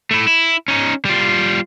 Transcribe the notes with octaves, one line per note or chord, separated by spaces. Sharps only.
A3 E4
E4
C#4 D#4
G3 F4